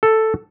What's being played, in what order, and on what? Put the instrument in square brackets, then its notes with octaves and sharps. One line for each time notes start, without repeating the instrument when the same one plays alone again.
[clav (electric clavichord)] A4